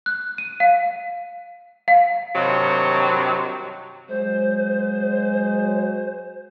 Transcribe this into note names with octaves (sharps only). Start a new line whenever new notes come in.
F#6
D#7
F5
F5
G2 C3 D#3 F#3
F#3 G#3 C5